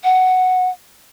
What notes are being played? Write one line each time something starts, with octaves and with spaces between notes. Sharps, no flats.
F#5